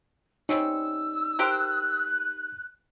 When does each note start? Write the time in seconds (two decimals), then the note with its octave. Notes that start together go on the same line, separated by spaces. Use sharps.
0.49 G3 C4 C#4 D#4 E6
1.39 G4 A#4 C5 F#6